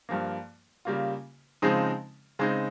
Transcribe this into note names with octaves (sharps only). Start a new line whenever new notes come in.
G2 F3 A#3
C#3 G3 A#3 F4
C#3 F3 G#3 C4 D#4
C#3 G#3 C4 D#4